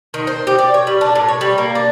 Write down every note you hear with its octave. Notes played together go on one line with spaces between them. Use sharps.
D#3
C5
G4
D5
C#5
G3
D4
A2
C#5
G3
A#3
D4